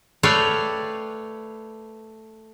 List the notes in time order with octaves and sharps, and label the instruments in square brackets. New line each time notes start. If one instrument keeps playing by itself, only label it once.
[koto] A3 B4 C#5 D5 F5 G5